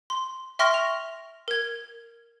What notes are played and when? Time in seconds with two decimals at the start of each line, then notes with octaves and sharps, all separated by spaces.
0.10 C6
0.59 E5 G5 C6 C#6 F6 A#6
0.74 F7
1.48 A#4 G#6